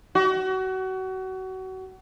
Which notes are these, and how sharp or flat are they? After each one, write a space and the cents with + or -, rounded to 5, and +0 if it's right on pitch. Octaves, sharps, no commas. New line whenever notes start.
F#4 +30